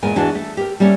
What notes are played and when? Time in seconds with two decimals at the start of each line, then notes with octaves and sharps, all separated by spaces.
0.02 E2 A#2 G#3 A#4 G#5
0.16 E2 E3 D4 F#4 G#4 A5
0.35 A3
0.57 G4 A#4
0.80 G3 A3 A#3 C#4